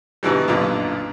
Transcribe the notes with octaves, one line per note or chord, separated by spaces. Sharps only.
G#2 B2 D3 E3 G3
B1 F#2 A#2 D3